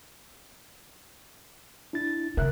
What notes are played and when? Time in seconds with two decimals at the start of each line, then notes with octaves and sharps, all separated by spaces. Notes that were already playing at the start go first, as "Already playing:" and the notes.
1.93 D4 E4 A6
2.37 C#3 A#4 E5 F#6